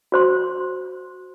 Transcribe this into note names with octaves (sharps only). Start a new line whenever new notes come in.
F#4 C5 C6